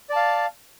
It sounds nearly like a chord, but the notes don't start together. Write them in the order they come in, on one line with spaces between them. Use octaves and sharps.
D5 A5 F5